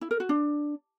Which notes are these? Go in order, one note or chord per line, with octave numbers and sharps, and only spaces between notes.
E4
A#4
F#4
D4